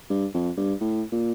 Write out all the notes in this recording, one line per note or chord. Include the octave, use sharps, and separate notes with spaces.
G2
F2
G2
A2
A#2